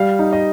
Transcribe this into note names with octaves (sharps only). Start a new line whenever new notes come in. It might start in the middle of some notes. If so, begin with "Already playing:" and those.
Already playing: G3 F5
D#4
D#5